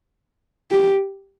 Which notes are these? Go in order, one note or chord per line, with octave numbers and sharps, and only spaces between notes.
G4